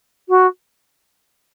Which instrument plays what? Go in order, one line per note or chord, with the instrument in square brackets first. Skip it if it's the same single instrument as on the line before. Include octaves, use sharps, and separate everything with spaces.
[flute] F#4